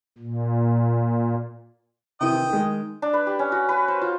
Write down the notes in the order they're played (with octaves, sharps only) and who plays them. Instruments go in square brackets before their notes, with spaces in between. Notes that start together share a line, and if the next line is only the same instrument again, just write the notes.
[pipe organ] A#2
[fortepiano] C3 D#3 E3 [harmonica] D#5 G5
[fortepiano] D#3 G#3
[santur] D4
B4
G4
C#4
F#4
B4
C5
F4